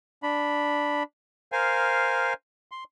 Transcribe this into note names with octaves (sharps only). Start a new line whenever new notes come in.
D4 B5
A#4 C5 F5 G#5
C6